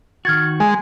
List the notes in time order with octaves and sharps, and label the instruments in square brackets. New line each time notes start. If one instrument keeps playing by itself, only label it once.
[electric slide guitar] D#3 F#4 [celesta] F6 G#6 A6
[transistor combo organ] G#3 [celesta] G#5